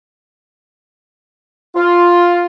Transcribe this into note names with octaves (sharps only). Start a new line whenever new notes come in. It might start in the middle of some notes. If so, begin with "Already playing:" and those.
F4